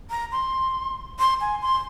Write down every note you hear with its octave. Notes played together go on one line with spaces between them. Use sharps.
A#5
C6
C6
G#5
C6